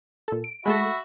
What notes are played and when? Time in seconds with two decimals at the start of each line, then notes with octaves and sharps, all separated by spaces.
0.28 A#2 A4
0.44 D7
0.66 G#3 A3 F#4 A4 E5 B5